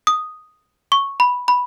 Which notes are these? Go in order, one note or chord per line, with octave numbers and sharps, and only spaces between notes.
D#6
C#6
B5
B5